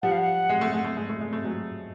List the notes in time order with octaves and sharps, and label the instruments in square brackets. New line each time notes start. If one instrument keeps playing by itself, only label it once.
[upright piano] F3 G3 [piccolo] F#5
[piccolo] F5
F#5
[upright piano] G#3
A3
G#3
A3
G#3
A3
G#3
A3
F#3 G#3